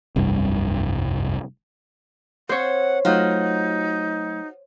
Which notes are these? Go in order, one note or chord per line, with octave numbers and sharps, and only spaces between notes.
F1 C2 G2
C4 C5 C#5 F#5
F#3 A3 D#4 F4 F#4